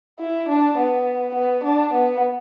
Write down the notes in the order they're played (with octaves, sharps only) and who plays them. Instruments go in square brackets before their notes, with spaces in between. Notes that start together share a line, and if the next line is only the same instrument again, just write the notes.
[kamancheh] E4
D4
B3
B3
D4
B3